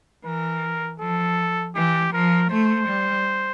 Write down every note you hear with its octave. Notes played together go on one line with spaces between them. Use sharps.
E3 A#4
F3 A4
E3 G4
F3 A#4
A3 C5
G3